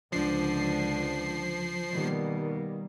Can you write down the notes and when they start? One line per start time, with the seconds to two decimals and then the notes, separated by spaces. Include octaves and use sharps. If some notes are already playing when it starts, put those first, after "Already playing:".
0.12 C#2 D3 F3 D4 C7
1.92 B2 D#3 G3 A#3